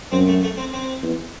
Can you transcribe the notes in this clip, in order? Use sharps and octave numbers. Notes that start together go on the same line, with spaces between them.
F#2 C4
A3
A3
C4
C4
E2